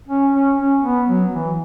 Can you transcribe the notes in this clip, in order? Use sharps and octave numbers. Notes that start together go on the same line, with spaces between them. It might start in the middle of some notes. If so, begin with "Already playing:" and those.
C#4
C#4
C#4
B3
F#3
E3